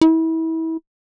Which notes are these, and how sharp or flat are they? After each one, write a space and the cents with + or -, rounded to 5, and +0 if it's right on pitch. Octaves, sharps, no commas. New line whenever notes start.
E4 -30